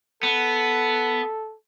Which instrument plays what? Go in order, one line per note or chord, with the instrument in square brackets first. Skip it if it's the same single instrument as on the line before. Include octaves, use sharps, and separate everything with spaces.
[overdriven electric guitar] B3 [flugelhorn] A4